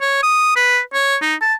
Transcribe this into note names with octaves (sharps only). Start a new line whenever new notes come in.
C#5
D#6
B4
C#5
D#4
A5